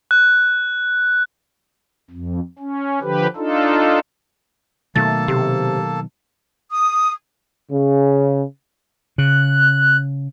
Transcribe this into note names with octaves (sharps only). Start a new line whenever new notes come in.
F#6
F2
C#4
D3 F3 G4 B4
D4 D#4 F4 A4
B2 D#3 F#3 A3 A#3 A4 A5 A6
C3 G4
D#6
C#3
C#3 F#6